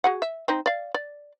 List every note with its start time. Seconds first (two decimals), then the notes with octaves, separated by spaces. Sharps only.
0.04 F#4 G#4 F#5
0.22 E5
0.48 C4 D#4 D#5
0.66 D5 F5
0.94 D5